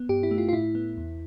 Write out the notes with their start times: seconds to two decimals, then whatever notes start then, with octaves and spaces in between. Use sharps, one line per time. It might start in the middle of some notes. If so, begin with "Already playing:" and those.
Already playing: B3
0.09 G2 G4
0.23 E4
0.31 A3
0.38 F4
0.49 F4
0.53 A2 E4
0.75 B3
0.97 E2